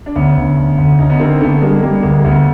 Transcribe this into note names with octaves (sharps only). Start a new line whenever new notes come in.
D4
D2 B3 C#4
D2
D2
D2
D2 C#4 D#4
B3
D3 A#3 C4
D3 A3 B3
G3 G#3 A#3
G3 A#3
B3
D2 G#3 A#3
D2 A3 B3